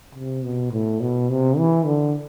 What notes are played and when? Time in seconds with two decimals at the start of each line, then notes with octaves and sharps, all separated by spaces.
0.15 C3
0.43 B2
0.72 A2
1.01 B2
1.30 C3
1.58 E3
1.86 D3